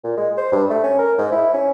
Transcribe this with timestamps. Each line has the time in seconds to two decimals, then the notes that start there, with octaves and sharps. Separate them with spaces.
0.04 A#2
0.17 G#3
0.38 C5
0.52 G2
0.70 A3
0.83 C#4
0.99 A#4
1.18 G#2
1.32 E4
1.54 C#4